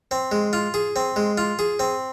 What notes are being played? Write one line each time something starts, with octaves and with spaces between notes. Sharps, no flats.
C4
G#3
F4
G#4
C4
G#3
F4
G#4
C4